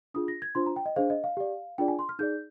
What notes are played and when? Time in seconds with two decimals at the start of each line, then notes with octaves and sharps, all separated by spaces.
0.14 D4 F4 G#4 D#6
0.28 A#6
0.42 G#6
0.55 D4 F4 C5 C6
0.66 A#5
0.76 G5
0.86 D#5
0.96 D4 G#4 C5 F5
1.10 D#5
1.24 F5
1.37 G4 D5
1.78 D4 F4 G#4 D5 G5
1.88 G#5
1.99 C6
2.09 F6
2.19 D#4 G#4 D5 G6